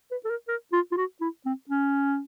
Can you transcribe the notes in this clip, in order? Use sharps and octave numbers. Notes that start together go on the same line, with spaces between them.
B4
A4
A#4
A#4
F4
F4
F#4
E4
C4
C#4